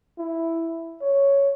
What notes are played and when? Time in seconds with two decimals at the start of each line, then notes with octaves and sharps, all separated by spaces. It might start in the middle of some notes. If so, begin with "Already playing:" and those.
0.19 E4
1.01 C#5